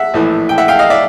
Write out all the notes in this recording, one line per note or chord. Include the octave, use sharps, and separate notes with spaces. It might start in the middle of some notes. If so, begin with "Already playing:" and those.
Already playing: E5 F#5
A#1 A2 E3 A3
G5
E5 F#5
F5 G5
D#5 F5
D5 E5